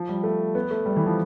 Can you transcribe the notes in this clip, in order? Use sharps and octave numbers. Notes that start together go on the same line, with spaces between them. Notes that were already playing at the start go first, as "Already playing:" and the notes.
Already playing: F3
G3
A3
B3
A3
G3
E3
F3